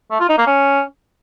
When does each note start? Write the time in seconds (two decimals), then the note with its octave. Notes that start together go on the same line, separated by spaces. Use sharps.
0.11 A3
0.20 F4
0.29 D#4
0.38 A#3
0.47 C#4